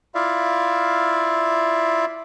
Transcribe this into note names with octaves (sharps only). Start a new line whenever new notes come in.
E4 F4 D5 E5 F5